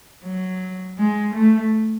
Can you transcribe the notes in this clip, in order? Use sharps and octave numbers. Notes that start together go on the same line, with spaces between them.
F#3
G#3
A3